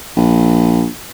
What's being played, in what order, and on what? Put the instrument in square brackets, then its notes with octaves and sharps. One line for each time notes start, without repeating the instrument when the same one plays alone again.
[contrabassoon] A#1